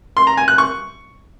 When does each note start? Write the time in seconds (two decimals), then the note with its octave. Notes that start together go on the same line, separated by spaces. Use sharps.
0.17 C6
0.27 A#5
0.37 G#5
0.48 F#6
0.58 C#6